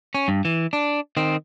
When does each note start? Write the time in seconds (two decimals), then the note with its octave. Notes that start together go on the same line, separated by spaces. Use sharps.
0.15 C#4
0.28 G2
0.45 E3
0.73 D4
1.17 D#3 C4